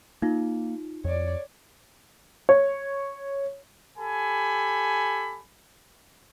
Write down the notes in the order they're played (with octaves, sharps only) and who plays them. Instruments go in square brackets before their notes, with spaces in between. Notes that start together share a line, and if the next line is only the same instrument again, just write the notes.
[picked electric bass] A#3 [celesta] D#4 F4
[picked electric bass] F2 [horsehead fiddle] C#5 D5
[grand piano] C#5
[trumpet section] G4 A4 G#5 B5